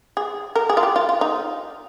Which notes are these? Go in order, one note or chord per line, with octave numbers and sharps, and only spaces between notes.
G#4
A#4
G#4
F4
G4
F4
F4
D#4